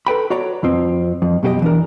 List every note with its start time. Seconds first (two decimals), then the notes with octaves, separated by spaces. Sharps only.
0.07 A4 B4 G5 B5
0.30 F#4 C#5 D5 A#5
0.63 F2 F3 C4
1.22 F2
1.43 F#2 B2 G4 G#4 D#5
1.62 E3 D4 A#4